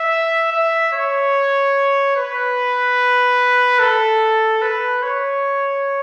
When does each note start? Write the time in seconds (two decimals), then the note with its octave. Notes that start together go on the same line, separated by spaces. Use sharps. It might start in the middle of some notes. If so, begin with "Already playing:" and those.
Already playing: E5
0.52 E5
0.93 C#5
2.16 B4
3.80 A4
4.62 B4
5.03 C#5